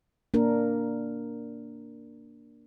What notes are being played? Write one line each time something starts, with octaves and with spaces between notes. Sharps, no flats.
A#3 D4 A#4